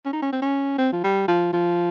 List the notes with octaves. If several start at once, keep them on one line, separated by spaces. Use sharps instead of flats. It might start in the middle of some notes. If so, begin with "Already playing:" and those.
C#4
D#4
C#4
C4
C#4
C4
F3
G3
F3
F3